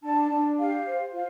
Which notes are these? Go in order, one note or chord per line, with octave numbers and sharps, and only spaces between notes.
D4 A5
D4
G4 F5
C5
F4 F5